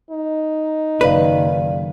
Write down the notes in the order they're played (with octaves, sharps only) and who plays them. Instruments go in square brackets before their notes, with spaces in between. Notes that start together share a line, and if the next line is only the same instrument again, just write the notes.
[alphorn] D#4
[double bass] F#1 D#3 [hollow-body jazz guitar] B4 [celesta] D5 F5